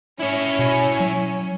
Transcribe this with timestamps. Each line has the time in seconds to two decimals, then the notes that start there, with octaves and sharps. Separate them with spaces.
0.20 C#4 E4 C#5
0.59 B2
1.00 F#3